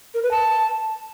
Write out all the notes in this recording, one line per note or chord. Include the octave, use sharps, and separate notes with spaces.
A#4
B4
A5